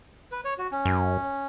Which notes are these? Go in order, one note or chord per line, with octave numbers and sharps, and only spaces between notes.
B4
C#5
F#4
C#4
F#2